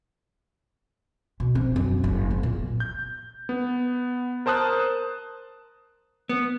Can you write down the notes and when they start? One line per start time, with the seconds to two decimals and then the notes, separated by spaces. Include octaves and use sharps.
1.40 B2
1.55 C4
1.76 F#2
2.04 F#1
2.31 B3
2.43 A#2
2.80 G6
3.49 B3
4.46 A#4 C5 A5 D#6 F#6
6.29 B3